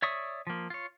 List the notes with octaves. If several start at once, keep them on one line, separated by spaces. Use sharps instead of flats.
C#5 D5 E5 C#6 D#6
F3 A#3
F4 C#5